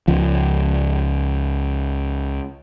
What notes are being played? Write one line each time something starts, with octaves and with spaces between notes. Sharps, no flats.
C#2 F3